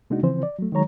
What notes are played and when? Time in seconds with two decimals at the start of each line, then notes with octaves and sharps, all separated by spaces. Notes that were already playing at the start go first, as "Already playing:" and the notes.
0.10 C3 G#3 A#3 D4 D#4 F#4
0.23 C#3 E3 F3 C4 C5
0.43 D5
0.59 F#3 A3
0.72 D#3 F#3 G#3 C#5 A#5